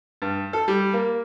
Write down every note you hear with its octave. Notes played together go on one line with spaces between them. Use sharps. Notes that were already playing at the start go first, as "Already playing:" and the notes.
G2
A4
G3
A#3